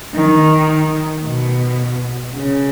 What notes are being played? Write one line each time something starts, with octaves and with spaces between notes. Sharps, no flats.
D#3
B2
C#3